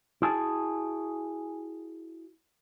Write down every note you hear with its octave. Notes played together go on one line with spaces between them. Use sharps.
E4 F#4 G#4 G#5 A5